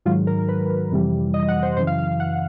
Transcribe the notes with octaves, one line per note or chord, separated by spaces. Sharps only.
G#2 D#3 F#3 F4
A#4
B4
F2 C3 E3 G3
D#5
F#5
C5
F#2 C#3 E3 C5
F5
F5
F#5